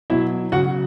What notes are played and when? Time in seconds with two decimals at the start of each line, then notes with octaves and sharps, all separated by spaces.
0.10 B2 F#3 E4 E5
0.52 C#3 F#4 F#5
0.56 F#3